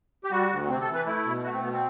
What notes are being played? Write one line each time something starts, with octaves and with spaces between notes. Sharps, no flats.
G4
G3 F#4
D2
C3 C4
A4
E3
B4
A3 E4
B2
A3 F#4
C4
B2 B3
C4